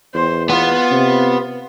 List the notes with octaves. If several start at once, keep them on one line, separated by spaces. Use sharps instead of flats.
E2 C5
B3 F4
C3